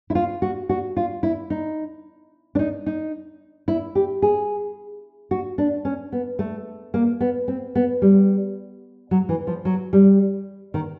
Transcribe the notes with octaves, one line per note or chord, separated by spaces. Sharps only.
E4
F4
F#4
F#4
F4
E4
D#4
D4
D#4
D#4
E4
G4
G#4
F#4
D4
C#4
B3
A3
A#3
B3
C4
B3
G3
F#3
E3
F3
F#3
G3
D#3